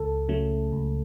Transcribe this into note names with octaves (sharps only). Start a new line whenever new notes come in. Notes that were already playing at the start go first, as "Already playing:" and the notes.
Already playing: C#2 A4
C#3 F#3 A3
C#2